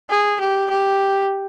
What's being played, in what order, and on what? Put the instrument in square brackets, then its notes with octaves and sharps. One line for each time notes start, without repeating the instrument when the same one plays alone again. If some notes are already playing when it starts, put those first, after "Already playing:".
[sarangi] G#4
G4
G4